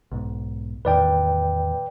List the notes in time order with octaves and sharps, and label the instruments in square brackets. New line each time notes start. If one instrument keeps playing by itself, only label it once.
[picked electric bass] B1 G#2
[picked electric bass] E2 A2 D#3 [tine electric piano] B4 D5 G5